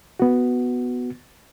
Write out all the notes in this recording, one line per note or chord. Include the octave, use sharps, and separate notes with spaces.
B3 F#4